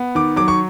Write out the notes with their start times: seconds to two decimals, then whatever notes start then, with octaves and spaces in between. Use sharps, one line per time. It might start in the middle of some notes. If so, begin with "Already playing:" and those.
Already playing: B3
0.15 D#3 D6
0.36 F#3 D6
0.48 C#6